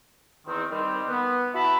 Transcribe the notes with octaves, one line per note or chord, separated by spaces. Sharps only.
E2 D#3 C4
D#3 G3 C4
B3
E4 F#4 E5 A5 B5